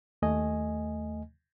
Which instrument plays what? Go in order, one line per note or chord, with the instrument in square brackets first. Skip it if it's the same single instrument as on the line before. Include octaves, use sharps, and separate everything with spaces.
[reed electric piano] D#2 A3 D#5 G#5